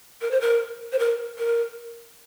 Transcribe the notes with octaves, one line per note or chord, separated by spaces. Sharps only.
A#4
C5
A#4
C5
A#4
A#4